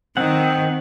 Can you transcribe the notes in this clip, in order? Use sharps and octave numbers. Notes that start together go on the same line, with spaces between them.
D#3 C4 F#5